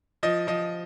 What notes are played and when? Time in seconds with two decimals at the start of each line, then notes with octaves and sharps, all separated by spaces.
0.23 F3 D#5
0.47 F3 D#5